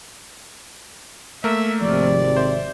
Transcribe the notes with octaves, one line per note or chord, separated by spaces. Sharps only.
A3 A#3 A#4 E5 E6
G#1 C3 F3 D5
C5 E5